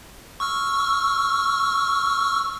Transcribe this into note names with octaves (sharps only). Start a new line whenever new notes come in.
C#6 E6 F6